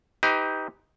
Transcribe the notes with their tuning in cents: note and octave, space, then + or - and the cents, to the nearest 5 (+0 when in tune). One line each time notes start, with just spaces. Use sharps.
D#4 +20 G4 +5 B4 +30